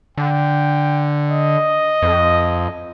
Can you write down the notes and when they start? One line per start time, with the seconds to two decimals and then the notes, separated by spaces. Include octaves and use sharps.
0.18 D3 G5
1.31 D#5
2.02 F2